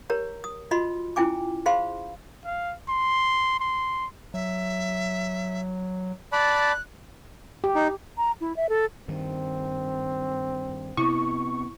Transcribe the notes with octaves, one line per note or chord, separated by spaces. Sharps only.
G4 A#4 C#5 A#5
D#6
F4 F#4 D#5 B5 C6
C#4 E4 F4 G5 G#5 D6
G#4 C5 F5 B5 C6
F5
C6
C6
F#3 E5
D5 A5 B5 F#6
G4
D#4
A#5
E4
E5
A4
G2 D#3 C4
C3 B3 E4 C#6